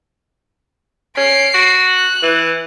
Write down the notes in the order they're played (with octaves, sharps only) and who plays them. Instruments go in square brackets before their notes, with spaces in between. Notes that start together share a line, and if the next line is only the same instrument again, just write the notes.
[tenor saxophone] C#4 [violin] C7 D7
[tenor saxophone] F#4
[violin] F#6
[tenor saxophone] E3